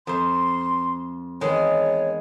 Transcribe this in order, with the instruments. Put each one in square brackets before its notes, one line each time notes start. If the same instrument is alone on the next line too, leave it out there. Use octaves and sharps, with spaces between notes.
[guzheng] F2 C5 [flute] C6
[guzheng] E2 D#3 G#3 [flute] C#5